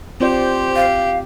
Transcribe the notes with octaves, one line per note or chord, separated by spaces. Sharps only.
C4 F4 G4 C5 D5
F5